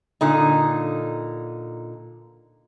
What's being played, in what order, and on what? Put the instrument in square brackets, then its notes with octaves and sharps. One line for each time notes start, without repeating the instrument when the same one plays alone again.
[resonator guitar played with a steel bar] A#2 D3 D#4